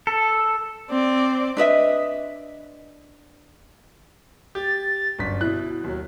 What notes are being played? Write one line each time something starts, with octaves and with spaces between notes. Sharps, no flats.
A4
C4 D5
D4 B4 D#5 E5
G4 A6
G1 F#2 B6
B2 E4 F#6
D#2 B2 F#3